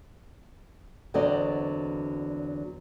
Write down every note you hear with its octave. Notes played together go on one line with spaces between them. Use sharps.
E2 D3 F#3 C4 D5 D#5